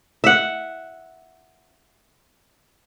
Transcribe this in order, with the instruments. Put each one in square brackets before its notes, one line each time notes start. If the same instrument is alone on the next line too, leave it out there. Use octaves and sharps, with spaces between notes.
[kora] E5 F#5